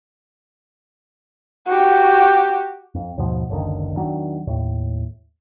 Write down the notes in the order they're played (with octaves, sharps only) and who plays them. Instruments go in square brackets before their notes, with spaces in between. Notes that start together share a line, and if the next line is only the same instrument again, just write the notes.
[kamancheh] F#4 G4
[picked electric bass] F2
D#2 G#2 B2 F3
F#1 C#2 D3 D#3
E2 D#3 F#3 D4
D#2 A2